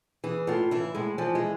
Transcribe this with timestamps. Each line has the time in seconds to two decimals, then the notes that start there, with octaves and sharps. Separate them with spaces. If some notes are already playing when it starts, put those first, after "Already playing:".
0.24 E3 G#4
0.47 A2 F4
0.71 E3 E4
0.95 A2 G#3
1.18 E3 F3
1.35 G#3